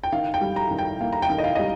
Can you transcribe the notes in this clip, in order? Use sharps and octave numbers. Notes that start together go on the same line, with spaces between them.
G5
D#3 F5
G5
G3
A#5
D#3
G5
A#3 F5
A#5
G5
D#3
D#5
F5
G3 D#5